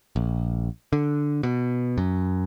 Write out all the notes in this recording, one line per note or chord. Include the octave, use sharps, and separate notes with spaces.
A#1
D3
B2
F#2